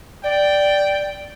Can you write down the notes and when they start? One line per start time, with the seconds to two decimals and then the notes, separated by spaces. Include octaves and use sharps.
0.24 D5 G5